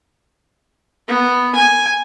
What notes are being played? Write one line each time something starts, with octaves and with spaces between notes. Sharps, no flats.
B3
G#5